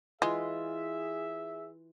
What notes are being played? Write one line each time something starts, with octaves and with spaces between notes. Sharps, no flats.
E3 G#3 F4 G#4 E5